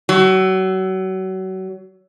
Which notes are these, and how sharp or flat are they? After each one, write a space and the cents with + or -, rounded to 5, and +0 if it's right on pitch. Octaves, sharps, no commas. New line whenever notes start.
F#3 +30